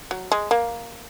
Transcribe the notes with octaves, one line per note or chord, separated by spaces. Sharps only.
F#3
G#3
A#3